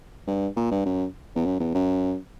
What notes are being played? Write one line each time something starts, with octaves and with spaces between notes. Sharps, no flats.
G2
A#2
G2
F#2
E2
F#2
E2
F#2